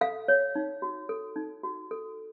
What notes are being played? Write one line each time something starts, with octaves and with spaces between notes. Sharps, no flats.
A4 F5
C#5
D#4
F#4
A4
D#4
F#4
A4